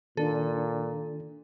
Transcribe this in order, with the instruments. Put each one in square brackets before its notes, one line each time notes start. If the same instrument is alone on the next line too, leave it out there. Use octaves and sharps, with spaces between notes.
[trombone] A#2 [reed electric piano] D#3 D4 [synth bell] A4